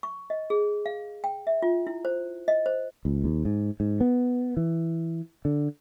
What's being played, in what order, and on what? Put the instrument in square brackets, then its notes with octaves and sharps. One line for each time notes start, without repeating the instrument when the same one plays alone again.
[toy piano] C#6
D#5
G#4
F5
G5
E5
F4
E4
C5
D#5
C5
[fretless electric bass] C#2
D#2
G#2
G#2
B3
E3
D3